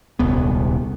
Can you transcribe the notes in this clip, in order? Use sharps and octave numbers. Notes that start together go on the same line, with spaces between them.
D#1 C2 B3